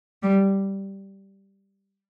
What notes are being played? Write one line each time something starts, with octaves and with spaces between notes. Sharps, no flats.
G3